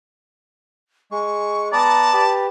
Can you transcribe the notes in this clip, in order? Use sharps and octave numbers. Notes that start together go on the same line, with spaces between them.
G#3 C#6
B3 D5 A5 A#5
G4 B4